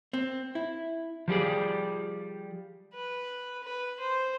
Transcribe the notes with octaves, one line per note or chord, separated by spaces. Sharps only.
C4
E4
F3 G3 G4 G#4
B4
B4
C5